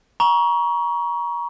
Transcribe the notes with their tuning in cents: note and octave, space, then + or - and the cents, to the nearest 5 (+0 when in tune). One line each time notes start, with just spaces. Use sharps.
A#5 +30 C#6 +20